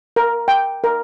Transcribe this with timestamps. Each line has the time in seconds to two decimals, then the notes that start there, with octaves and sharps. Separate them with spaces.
0.16 A#4
0.48 G5
0.84 A#4